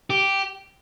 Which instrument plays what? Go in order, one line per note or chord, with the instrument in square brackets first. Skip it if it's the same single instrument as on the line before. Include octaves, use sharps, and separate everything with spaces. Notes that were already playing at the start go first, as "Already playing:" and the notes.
[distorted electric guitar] G4